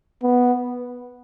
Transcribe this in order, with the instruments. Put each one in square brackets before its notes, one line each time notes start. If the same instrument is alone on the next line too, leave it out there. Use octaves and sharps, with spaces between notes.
[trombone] B3